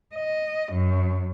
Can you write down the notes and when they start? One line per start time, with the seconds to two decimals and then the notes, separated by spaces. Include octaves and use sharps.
0.15 D#5
0.72 F#2